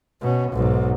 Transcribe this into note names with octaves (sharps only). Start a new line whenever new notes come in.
B2 C#4
B1 G#2